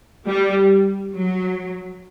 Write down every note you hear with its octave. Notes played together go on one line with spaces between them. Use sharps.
G3
F#3